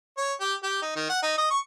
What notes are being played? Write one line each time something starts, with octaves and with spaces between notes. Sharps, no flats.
C#5
G4
G4
D#4
D#3
F#5
D#4
D#5
C#6